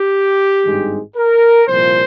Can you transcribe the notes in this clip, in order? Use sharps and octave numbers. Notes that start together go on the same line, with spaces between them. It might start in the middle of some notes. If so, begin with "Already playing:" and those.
Already playing: G4
G#1 G2 D#3 G#3
A#4
C2 A#2 F3 C5